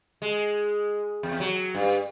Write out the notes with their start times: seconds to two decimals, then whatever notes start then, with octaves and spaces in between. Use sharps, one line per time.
0.22 G#3
1.23 E2
1.40 F#3
1.75 G2